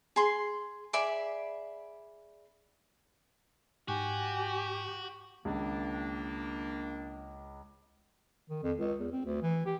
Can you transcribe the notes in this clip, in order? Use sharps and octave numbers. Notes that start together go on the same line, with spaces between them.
G#4 C6
G#4 D5 E5 B5
G#2 F#4 G4 G#5
C#2 D#3 A#3 D4
D#3
F2
C#2
E2
C4
D2
E3
G4